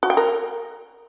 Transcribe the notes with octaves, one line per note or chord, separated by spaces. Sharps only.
F#4
G5
A#4